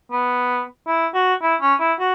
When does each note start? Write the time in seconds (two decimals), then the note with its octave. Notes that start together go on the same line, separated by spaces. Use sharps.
0.11 B3
0.87 E4
1.14 F#4
1.42 E4
1.62 C#4
1.80 E4
1.99 F#4